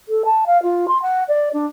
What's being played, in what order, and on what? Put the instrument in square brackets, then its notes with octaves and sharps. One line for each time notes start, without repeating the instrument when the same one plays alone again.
[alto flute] A4
A5
F5
F4
C6
F#5
D5
D4